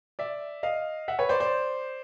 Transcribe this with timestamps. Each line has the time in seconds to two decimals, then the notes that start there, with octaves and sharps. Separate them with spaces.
0.19 D5 E5
0.63 D#5 F5
1.08 E5 F#5
1.19 B4 C#5
1.29 C5 D5
1.40 C5 D5